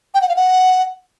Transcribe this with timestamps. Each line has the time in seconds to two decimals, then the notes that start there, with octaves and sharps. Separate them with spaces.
0.14 G5
0.22 F#5
0.29 F5
0.36 F#5